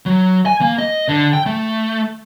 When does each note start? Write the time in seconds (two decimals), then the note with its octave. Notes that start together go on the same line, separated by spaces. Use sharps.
0.06 F#3
0.46 G#5
0.61 A#3
0.79 D#5
1.08 D3
1.33 G5
1.46 A3